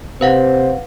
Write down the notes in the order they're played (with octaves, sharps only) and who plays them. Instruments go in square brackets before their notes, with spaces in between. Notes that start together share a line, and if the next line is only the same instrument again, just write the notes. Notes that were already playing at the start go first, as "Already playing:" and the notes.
[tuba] C3 [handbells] B4 F5 F#5 [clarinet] C5